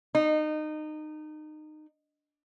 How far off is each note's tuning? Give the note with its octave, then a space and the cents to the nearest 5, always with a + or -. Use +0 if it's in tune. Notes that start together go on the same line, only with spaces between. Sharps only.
D#4 -25